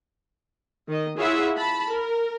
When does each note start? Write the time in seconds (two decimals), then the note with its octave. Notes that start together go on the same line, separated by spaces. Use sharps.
0.87 D#3 D#5
1.18 E4 F4 G#4 C#5 E5 F#5
1.57 A5 B5
1.87 A#4